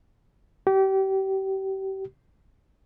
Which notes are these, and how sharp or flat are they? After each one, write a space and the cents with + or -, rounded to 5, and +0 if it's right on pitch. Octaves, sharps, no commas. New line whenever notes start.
G4 -30